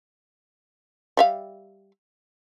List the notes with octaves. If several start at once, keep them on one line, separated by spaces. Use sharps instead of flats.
G3 E5 F5